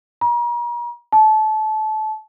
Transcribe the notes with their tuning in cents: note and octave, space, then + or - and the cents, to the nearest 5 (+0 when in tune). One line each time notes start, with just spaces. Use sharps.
A#5 +40
A5 -25